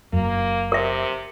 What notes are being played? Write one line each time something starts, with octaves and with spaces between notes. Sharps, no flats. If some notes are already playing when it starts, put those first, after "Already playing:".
F#1 F#2 A#3
C3 A#4 E5